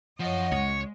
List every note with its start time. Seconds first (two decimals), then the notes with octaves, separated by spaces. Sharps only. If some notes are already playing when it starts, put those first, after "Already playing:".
0.20 F#2 F3 C#5 D#5 F#5
0.52 C#2 G#3 C#5